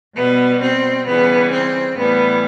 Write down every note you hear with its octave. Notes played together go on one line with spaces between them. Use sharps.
B2 G3 B3
C4
C#3 E3 G3 B3
C4
A2 E3 G3 B3